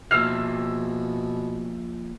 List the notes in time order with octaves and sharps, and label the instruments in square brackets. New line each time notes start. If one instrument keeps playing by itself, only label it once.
[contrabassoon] B2 [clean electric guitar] F3 A#3 E5 [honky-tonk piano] E6 C7 [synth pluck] F6